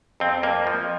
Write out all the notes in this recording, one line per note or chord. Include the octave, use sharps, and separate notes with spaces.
F2 C4
F2 A#3
F3